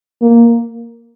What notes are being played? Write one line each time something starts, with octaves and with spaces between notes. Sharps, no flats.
A#3